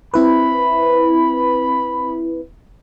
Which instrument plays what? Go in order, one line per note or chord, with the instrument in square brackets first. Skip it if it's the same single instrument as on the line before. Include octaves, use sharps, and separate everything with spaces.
[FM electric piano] C4 E4 B4 [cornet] B5